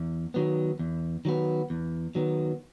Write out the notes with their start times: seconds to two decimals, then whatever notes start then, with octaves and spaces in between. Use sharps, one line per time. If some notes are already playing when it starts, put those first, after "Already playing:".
Already playing: E2
0.34 D#3 F#3 B3
0.79 E2
1.25 D#3 F#3 B3
1.70 E2
2.15 D#3 F#3 B3